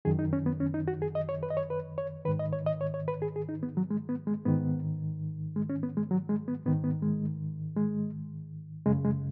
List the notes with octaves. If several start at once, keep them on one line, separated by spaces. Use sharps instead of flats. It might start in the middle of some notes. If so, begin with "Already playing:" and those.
F#2 D#3 G#4
D#4
C#4
B3
C#4
D#4
F#4
G#4
D#5
C#5
B4
D#5
C#5
B4
C#5
G#2 D#3 B4
D#5
C#5
D#5
C#5
C#5
B4
G#4
G#4
D#4
B3
F#3
G#3
B3
G#3
G#2 D#3 B3
G#3
C#4
B3
G#3
F#3
G#3
B3
G#2 D#3 B3
B3
G#3
G#3
F#2 C#3 G#3
G#3